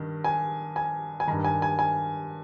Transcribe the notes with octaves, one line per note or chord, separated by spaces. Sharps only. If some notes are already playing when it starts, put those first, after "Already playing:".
Already playing: G2 D#3
G#5
G#5
G#5
G2 D#3 A#5
G#5
G#5
G#5